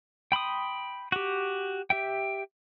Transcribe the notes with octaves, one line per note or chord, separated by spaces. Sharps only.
G5 B5 C6 D#6
F#4 G4
G4 E5 G5